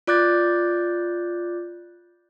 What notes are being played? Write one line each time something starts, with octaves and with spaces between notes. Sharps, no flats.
F4 D5 D6 F#6 G6 A6